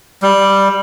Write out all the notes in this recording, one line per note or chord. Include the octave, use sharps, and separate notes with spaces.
G3